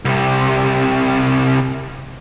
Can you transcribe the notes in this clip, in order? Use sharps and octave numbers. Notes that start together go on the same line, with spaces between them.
C2 C3